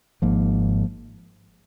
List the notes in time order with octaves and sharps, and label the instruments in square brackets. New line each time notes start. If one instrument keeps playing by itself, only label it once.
[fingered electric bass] G#1 G#2 F3 A#3